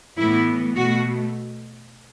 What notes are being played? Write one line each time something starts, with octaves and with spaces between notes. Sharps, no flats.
A2 E3 B3 E4
B2 A3 F#4